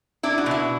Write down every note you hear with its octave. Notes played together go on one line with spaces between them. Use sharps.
D4 E4
F#4
B2 E4